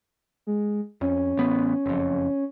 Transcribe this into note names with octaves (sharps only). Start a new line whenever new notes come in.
G#3
F2 C#4
A1 B3
F#1 F2